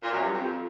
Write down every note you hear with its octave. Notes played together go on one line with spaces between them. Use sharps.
A#2
F#2
G2
F2